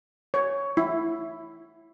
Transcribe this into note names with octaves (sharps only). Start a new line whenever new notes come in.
C#5
E4